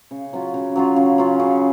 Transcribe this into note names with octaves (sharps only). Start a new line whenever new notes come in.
C#3
F#3 C#4 F4
C#3
F#3 C#4 F4
C#3
F#3 C#4 F4
C#3